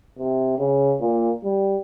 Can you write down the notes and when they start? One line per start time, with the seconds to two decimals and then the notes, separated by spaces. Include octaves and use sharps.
0.19 C3
0.58 C#3
1.00 A#2
1.44 G3